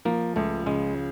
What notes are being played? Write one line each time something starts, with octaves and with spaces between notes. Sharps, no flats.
F3 A#3
C#2 A3
C#3 G#3